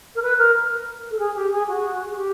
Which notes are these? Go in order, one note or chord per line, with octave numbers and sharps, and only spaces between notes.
A#4
B4
A#4
A4
G#4
G4
G#4
F#4
G#4
G4